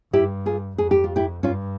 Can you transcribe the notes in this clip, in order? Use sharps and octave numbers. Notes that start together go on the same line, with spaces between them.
G2 E4 G4
F4 G#4
F2 G#4
G4
F4
E4 G4
G2 C#4 F4